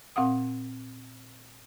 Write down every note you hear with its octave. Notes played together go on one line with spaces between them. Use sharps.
A#2 C4 F5 F#5 D#6